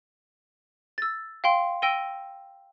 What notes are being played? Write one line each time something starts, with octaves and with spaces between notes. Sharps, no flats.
E6 A6
F5 G5 C6
G5 E6 A#6 D#7 G7